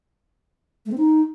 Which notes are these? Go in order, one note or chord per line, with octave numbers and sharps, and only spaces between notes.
A3
C4
D#4